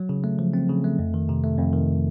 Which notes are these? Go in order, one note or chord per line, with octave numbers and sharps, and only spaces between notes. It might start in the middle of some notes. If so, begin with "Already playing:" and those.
Already playing: F#3
C#3
A3
F3
C4
C#3
A3
F2
D#3
C3
A3
F2
D#3